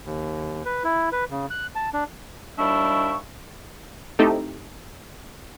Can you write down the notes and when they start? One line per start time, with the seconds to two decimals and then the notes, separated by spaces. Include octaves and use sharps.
0.06 D#2
0.65 B4
0.84 E4
1.12 B4
1.31 C#3
1.50 F#6
1.75 A5
1.94 D4
2.58 D#2 G3 D4 E4 E5 C#6
4.19 A3 C4 D#4 E4 G4 A4